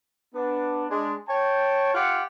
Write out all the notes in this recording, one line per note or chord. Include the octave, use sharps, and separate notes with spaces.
B3 D4
G#3 D4
C#5 G5 A5
F4 G4 F5 F#5